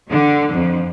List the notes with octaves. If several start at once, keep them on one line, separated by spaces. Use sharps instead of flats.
D3
F2